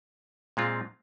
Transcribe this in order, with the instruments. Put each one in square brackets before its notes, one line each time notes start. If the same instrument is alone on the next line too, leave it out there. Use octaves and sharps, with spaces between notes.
[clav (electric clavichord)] A#2 G#3 C4 F4